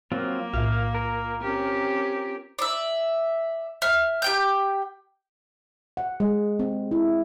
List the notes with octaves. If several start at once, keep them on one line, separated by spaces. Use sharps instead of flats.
F#3 A#3 C4 F4
B1 A2 F4 F5
A#4
C4 C#4 G4
D5 E5
E5 F6
G4 G5 G6
F#5
G#3
C4
E4